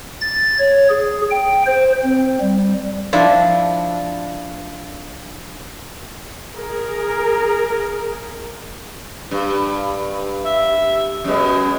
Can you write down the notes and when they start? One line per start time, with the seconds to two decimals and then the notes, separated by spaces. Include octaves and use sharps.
0.21 A6
0.58 C#5
0.89 G#4
1.31 G5
1.66 C5
2.03 C4
2.41 G3
3.13 F3 D4 E4
6.56 G#4 A#4
9.31 G2
10.45 E5
11.24 F#2 B2 G#3